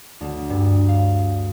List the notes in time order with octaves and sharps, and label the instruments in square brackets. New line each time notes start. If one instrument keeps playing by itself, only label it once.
[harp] D2
G2
F5